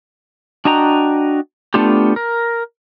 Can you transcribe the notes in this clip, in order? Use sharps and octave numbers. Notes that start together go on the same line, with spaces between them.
D4 F#4 D#5 G5 A#5
A3 B3 D4 F4 G4
A#4